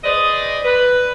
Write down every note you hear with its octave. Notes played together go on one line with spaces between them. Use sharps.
G#4 B4 C5 D5 D#5
B4